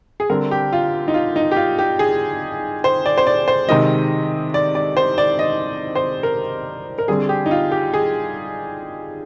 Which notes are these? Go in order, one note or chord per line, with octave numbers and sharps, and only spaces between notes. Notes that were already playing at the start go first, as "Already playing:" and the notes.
G#4
D3 G3 C4 A#4
G4
F4
D#4
F4
D#4
G4
F4
G4
G#4
C5
D5
C5
D5
C5
C3 D#3 G#3 C4 D#5
D5
D5
C5
D5
D#5
C5
A#4
A#4
D3 G3 C4 G#4
G4
D#4
F4
G4
G#4